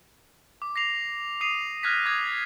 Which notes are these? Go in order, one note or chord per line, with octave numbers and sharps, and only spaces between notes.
D6
A#6 C7 F7
D#6 C7 D#7 F7
F6 F#6 G#6 A#6 B6
D6 D#6 G#6